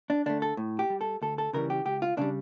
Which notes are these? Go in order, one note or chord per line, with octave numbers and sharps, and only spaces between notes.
D4
D3 A3 D4
A4
A2
G4
G3
A4
D2 A4
A4
C#3 E3 G3 A#4
G4
C#2 G4
F4
C#3 G3 D4